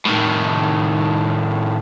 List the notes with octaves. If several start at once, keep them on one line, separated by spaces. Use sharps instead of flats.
A2 D#3